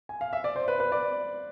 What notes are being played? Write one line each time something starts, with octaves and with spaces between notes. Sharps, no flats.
G#5
F5
E5
D5
C5
B4
B4
D5